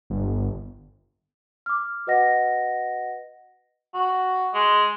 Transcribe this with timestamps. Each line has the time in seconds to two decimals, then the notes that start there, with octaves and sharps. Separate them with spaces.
0.10 G1
1.66 D6 F6
2.07 F#4 B4 D#5 F#5 A#6
3.94 F#4
4.54 G#3